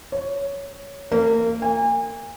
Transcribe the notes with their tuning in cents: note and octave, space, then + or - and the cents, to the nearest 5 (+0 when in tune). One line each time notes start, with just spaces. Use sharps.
C#5 +10
A#3 -25
G#5 -35